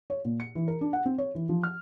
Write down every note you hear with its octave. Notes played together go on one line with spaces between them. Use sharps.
C#5
A#2
C#7
E3
A#4
D4
F#5
C4
C#5
E3
F3
F6